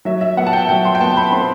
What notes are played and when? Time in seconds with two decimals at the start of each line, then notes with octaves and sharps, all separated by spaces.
0.05 F#3 E5
0.21 E5
0.37 B3 F#5
0.47 A5
0.53 G5
0.69 F#3 G5
0.85 C6
0.95 G5
1.01 B3 A5
1.17 B5
1.32 C4 C6